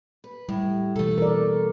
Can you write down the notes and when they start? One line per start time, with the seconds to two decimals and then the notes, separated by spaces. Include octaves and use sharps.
0.24 B4
0.49 A2 G3
0.96 B2 E3 A3 A4
1.18 A#4 D5